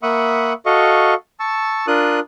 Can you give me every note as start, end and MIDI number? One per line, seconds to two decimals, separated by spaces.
0.03 0.53 58
0.03 0.53 76
0.03 0.53 78
0.03 0.53 83
0.03 0.53 85
0.03 0.53 87
0.66 1.14 66
0.66 1.14 69
0.66 1.14 75
0.66 1.14 77
0.66 1.14 85
1.40 1.86 81
1.40 1.86 85
1.40 1.86 88
1.87 2.20 62
1.87 2.20 65
1.87 2.20 70
1.87 2.20 87
1.87 2.20 90